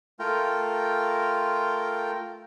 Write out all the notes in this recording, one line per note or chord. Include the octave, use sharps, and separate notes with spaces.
A3 F4 A#4 G5